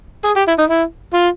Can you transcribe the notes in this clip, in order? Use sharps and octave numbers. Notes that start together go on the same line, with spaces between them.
G#4
G4
E4
D#4
E4
F4